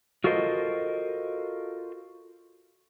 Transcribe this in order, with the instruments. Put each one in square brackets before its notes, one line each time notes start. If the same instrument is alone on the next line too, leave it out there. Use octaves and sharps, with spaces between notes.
[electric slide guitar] F4 F#4 A4 A#4 C5 D#5